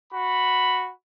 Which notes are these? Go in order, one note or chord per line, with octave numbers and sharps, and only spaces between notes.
F#4 B5